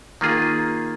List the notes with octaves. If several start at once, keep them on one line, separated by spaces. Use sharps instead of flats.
D#3 A#3 F4 G#4